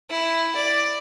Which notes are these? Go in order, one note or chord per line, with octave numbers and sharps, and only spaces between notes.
E4
D5